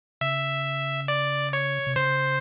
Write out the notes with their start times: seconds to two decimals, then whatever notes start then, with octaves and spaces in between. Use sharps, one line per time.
0.21 C#3 E5
1.08 D5
1.53 C#5
1.87 C3
1.96 C#3 C5